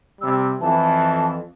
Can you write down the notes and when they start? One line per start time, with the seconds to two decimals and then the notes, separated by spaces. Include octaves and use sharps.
0.21 C3 G3 E6
0.61 F2 E3 A5